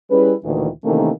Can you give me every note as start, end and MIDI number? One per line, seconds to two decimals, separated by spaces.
0.11 0.34 55
0.11 0.34 61
0.11 0.34 64
0.11 0.34 68
0.11 0.34 71
0.44 0.68 38
0.44 0.68 46
0.44 0.68 51
0.44 0.68 52
0.84 1.10 48
0.84 1.10 51
0.84 1.10 52
0.84 1.10 57
0.84 1.10 58
0.84 1.10 61